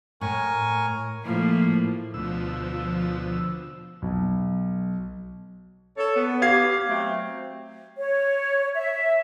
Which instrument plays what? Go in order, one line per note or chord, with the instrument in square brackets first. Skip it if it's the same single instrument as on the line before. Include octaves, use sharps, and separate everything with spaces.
[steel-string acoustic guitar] A2 [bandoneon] A#4 G#5 C#6
[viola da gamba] A2 F3 A#3
[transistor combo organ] D2 B2 E6 [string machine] F3
[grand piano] B1
[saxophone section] A4 C#5
B3
[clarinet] G4 [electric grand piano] F5 G#6 C7
[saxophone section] F#3 C4 [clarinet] A3
[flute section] C#5
E5